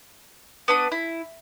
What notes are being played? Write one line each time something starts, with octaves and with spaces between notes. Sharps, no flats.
B3 D4 D#6
E4